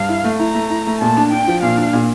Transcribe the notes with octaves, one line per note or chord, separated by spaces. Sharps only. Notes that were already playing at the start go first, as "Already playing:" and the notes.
Already playing: G2 F5
E4
A3
E4 A#5
A3
E4
A3
A#2 A5
D4
D4 G5
F3
A#2 F5
D4
A#2